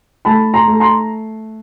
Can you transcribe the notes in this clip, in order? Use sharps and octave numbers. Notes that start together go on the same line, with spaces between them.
A3 A5 B5
A#5 C6
A3
A#5 C6